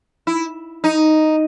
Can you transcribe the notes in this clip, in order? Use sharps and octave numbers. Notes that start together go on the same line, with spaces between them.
E4
D#4